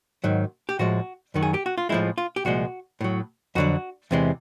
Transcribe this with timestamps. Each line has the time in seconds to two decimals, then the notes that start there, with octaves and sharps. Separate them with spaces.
0.24 G#2 D#3 F#3
0.69 G4
0.79 A2 F3 G#3 F#4
1.34 F#2 D#3 F#3
1.43 G#4
1.54 G4
1.66 F#4
1.78 F4
1.89 A2 F3 G#3 E4
2.18 F4
2.36 G4
2.45 C2 A#2 F3 G#3 F#4
3.01 A2 F#3
3.55 F2 D3 F#3 F#4
4.11 E2 C3 E3 G#3